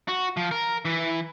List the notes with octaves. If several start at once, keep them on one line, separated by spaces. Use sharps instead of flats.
F#4
F3
A#4
E3